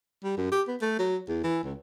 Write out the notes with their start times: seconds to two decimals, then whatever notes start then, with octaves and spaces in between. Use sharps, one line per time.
0.23 G3
0.37 F#2
0.52 G4
0.68 B3
0.81 A3
0.99 F#3
1.28 E2
1.44 E3
1.63 C#2